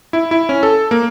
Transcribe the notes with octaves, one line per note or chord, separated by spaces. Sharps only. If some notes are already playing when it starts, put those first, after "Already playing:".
E4
E4
C#4
A4
A#3